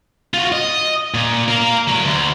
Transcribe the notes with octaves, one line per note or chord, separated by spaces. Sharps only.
F4 F#4
D#5
A#2
A#4 F5
D3 F#3
D2